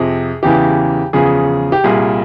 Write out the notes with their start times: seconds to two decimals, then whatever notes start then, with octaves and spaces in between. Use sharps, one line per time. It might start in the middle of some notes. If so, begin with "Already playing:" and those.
Already playing: F2 C3 F3 G#4
0.43 E2 C#3 E3 G4
1.13 E2 C#3 F3 G#4
1.72 G4
1.84 C2 A#2 G3 G#4